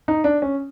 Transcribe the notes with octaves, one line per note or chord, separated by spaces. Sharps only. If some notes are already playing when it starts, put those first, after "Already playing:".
D#4
D4
C#4